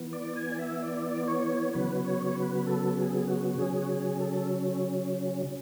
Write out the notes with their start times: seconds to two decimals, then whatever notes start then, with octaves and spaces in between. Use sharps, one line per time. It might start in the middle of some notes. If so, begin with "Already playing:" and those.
Already playing: E3 B3
0.13 D5
0.36 G#5
0.52 D5
0.59 E5
0.82 D5
1.28 C#5
1.74 C#3 F#3 B3 B4
2.05 C#5
2.26 C#5
2.35 B4
2.67 A4
2.97 G#4
3.27 F#4
3.50 F#4
3.58 C#3 F#3 C#4 G#4
3.82 F#4
3.90 G#4
4.20 A4